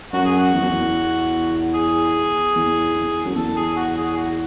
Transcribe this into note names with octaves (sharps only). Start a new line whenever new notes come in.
F#2 F#4
G#4
F#4
E2
F#2
E2
G#4
E2
E2
F#2
E2 A4
G#4
F#4
G#4
F#4